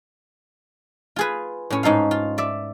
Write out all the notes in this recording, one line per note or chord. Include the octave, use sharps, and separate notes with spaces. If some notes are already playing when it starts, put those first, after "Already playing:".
F4 G#4 B4
A2 C#4
G#2 D#4 A4 F5
F4
D5 E5